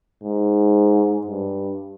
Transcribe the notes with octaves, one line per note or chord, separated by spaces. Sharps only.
G#2
G2